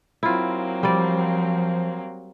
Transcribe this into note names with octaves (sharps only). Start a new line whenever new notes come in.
F#3 A#3 C4 E4 F4
F3 G3 D5